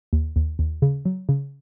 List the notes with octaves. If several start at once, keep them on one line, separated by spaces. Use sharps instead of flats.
D#2
D#2
D#2
C#3
F#3
C#3